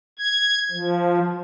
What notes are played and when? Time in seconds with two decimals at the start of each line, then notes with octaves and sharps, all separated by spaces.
0.19 G#6
0.71 F3